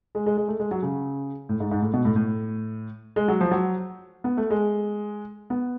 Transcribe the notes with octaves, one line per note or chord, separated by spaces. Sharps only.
G#3
G#3
G#3
A3
G#3
F#3
C#3
A2
G#2
G#2
A2
B2
A2
A2
G#3
F#3
F3
F#3
B3
A3
G#3
B3